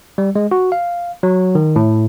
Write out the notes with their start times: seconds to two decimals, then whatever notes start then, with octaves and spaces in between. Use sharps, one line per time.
0.18 G3
0.35 G#3
0.51 F#4
0.72 F5
1.23 F#3
1.55 D#3
1.76 A2